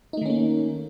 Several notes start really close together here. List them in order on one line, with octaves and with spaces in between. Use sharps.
D#4 A3 D#3 C#4 A#3